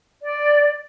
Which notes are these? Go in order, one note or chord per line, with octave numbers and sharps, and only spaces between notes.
D5